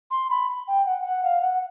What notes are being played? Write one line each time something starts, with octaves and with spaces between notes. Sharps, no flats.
C6
B5
G5
F#5
F#5
F5
F#5